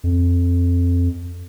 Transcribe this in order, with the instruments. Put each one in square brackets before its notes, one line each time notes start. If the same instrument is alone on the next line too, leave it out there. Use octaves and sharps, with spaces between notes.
[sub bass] F2